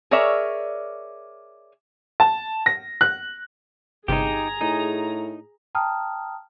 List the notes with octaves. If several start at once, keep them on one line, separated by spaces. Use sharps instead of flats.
G#4 A#4 C#5 D5 E5
A5
A#6
F#6
G1 C3 D#4 G4 G#4 A#5
A2 D#4
G5 A5 A#5 D#6 F6